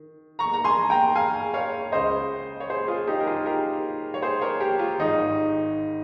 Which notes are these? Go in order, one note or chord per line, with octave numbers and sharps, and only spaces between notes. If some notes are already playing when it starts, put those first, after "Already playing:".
Already playing: D#3
A#5 C#6
A#5
G#5 C6
G5 A#5
F5 G#5
C#5 F5
C#2 C#3 G#3 C5 D#5
C#5
G#4 C5
F4 G#4
D#4 G4
A#4
F4 G#4
G4 A#4
C#5
G#4 C5
A#4 C#5
G4 A#4
F4
G#1 G#2 D#3 D#4